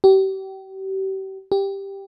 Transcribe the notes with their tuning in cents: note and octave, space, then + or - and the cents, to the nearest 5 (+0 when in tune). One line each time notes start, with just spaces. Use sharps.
G4 -35
G4 +5